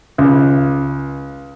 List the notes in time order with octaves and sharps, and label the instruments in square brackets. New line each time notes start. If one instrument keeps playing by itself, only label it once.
[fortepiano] C#2